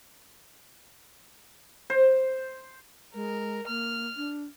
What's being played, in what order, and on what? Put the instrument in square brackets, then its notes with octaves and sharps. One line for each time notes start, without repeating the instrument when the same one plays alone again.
[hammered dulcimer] C5
[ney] G#3 [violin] A#4
[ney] A#3 [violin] F6
[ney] D4